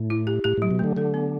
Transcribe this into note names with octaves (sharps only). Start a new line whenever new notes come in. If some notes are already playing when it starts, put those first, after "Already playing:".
Already playing: A2
E4
G4
A2 G4
A2 F#3
B2
D3 A3
D3 A4
B3